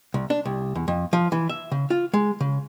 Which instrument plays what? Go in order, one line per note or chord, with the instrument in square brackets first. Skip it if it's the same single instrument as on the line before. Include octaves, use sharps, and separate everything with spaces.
[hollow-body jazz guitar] C2
D4
C2
E2
F2
F3
E3
E5
C#3
F4
G#3
C#3